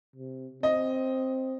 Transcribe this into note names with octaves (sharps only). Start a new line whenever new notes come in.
C3
C4 D#5